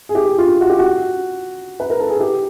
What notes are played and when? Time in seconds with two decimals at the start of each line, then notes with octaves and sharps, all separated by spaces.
0.09 G#4
0.15 G4
0.38 F4
0.61 F#4
0.70 G4
0.79 F#4
1.80 B4
1.90 A#4
2.00 A4
2.10 G#4
2.20 G4